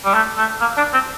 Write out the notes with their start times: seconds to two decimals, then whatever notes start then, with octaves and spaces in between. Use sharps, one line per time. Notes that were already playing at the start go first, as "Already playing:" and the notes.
0.05 G3
0.14 A3
0.37 A3
0.61 A#3
0.77 D4
0.93 C4